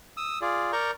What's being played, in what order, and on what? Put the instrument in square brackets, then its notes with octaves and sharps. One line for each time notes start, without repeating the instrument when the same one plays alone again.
[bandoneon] D#6 E6
F4 G#4 D5
A#4 D5 A#5 C#6 G6